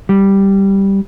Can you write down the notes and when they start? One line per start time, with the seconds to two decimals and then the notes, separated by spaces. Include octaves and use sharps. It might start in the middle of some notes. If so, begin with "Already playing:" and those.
0.09 G3